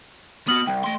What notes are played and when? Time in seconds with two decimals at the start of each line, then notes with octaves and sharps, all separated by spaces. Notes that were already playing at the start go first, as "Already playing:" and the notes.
0.48 B3 F#4 D#6 F6 F#7
0.67 C2 G5
0.84 A3 C6